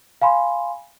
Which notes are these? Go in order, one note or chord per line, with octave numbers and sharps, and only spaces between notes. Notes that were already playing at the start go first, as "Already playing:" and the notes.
F5 G#5 B5 C6